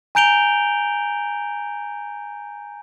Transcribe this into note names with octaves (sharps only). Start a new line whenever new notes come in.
G#5 A#5 G6 D7 F7 G7